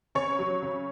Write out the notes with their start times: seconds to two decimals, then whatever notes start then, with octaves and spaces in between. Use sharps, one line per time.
0.15 C#3 C#5 C#6
0.39 F#3
0.62 C#3